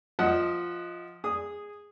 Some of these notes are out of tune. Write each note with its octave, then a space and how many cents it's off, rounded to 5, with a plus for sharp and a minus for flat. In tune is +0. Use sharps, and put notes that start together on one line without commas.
F3 +0 D#5 +20 F#5 +0
G#4 -10 D#6 +0